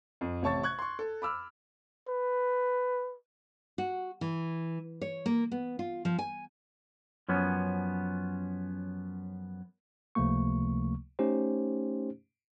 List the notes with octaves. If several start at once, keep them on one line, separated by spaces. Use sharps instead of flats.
F2
A1 C3 C#5 A5 C#6 A6
C#6 F#6 G#6
C6 C#6
A4
B5 D6 E6 F6
B4
F#4
E3
C#5
A#3
B3
F4
F3
G#5
F#2 F3 B3 C#4
C#2 C3 F3 A3 A#3 C#6
A3 C#4 D#4 G4 C5